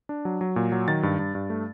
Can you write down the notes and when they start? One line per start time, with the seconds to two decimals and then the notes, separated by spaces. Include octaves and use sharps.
0.09 D4
0.25 F#3
0.41 F#3
0.56 A#2
0.72 F#3
0.88 D#3 A6
1.03 G2
1.19 G2
1.35 G2
1.50 A3